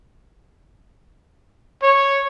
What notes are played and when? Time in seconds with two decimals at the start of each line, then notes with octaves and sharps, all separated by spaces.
1.83 C#5